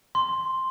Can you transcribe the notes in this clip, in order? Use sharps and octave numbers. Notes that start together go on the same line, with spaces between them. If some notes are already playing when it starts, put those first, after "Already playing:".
C6